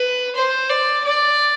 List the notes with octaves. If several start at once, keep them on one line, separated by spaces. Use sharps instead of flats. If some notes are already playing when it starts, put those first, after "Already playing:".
Already playing: B4
C5
D5
D5